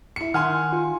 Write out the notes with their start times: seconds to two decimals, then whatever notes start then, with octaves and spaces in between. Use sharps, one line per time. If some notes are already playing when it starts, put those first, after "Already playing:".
0.16 E4 C#7
0.34 D#3 F#5 G#5 C6 F6
0.73 F4